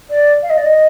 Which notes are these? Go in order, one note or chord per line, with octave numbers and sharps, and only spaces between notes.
D5
F5
D#5
D5
D#5